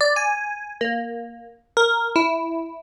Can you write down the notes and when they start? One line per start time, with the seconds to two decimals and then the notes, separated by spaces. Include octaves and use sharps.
0.01 D5
0.16 G#5
0.81 A#3
1.77 A#4
2.16 E4